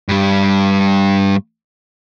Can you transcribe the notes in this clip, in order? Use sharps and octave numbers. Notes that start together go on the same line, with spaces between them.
G2 G3